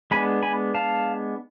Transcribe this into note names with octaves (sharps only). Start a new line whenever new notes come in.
G#3 B3 D4 G#5 B5
G#5 B5
F5 A5